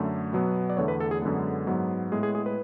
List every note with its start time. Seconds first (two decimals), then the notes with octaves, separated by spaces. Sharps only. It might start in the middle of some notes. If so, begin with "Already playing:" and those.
Already playing: F#2 D3 A3
0.33 B2 F#3 B3
0.70 D5
0.77 E2 D3 A3 C#5
0.88 B4
1.00 A4
1.11 G#4
1.22 F#2 D3 G#3 B3
1.67 G#2 F#3 B3
2.11 A2 G#3 B3 G#4
2.23 G#4
2.35 G#4
2.46 B4